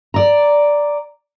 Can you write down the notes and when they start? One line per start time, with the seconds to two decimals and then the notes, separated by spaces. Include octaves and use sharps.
0.14 D5 A#5